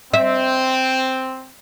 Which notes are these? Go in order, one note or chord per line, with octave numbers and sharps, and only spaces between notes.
C4 E5